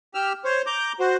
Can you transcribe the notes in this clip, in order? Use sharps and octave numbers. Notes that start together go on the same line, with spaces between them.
G4 E6 F6
C5 C#5
A#5 D6 G6
F#4 C5